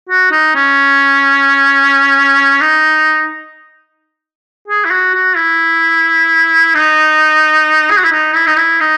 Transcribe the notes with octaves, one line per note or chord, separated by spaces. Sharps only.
F#4
D#4
C#4
D#4
G#4
E4
F#4
F#4
E4
D#4
G#4
F#4
E4
D#4
E4
D#4
E4
D#4